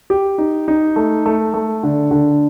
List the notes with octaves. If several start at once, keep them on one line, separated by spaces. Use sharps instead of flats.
G4
D#4
D#4
A3
A3
A3
D3
D3